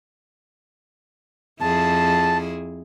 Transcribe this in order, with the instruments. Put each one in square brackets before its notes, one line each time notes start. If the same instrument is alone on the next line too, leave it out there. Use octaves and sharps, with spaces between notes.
[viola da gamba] F2 E4 G#4 [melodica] A5